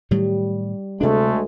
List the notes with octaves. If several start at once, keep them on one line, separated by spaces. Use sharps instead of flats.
A2 D#3 F#3 G3
D2 C3 G#3 A3 D4